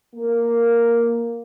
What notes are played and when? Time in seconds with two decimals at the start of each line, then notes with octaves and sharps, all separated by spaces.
0.16 A#3